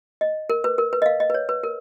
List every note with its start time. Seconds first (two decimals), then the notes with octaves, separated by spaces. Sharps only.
0.21 D#5
0.50 A#4
0.64 B4
0.78 A#4
0.93 B4
1.02 D#5
1.06 F5
1.20 D#5
1.30 B4
1.34 C#5
1.49 B4
1.63 A#4